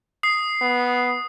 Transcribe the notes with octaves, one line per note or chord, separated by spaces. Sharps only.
D#6 C7
B3